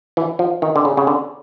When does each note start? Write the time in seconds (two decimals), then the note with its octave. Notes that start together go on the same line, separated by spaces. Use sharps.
0.17 E3
0.39 F3
0.62 D#3
0.76 D3
0.85 C#3
0.97 C#3
1.07 D3